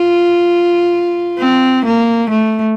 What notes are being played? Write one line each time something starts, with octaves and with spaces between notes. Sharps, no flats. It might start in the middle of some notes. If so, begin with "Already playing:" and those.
Already playing: F4
C4
A#3
A3